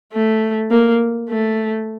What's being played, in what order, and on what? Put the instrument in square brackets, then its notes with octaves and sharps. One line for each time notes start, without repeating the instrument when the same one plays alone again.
[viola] A3
A#3
A3